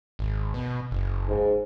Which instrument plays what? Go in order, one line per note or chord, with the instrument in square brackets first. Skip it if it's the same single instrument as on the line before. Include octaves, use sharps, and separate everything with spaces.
[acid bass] G#1
B2
F#1
[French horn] G#2